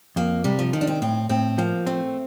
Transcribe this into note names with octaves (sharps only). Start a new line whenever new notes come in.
F2 A#3
C3 G3
F3
D#3 F3
D4
C4
A2 C4
A2 C4
F3 A#3
A3 C4